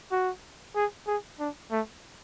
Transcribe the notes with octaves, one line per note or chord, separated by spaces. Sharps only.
F#4
G#4
G#4
D4
A3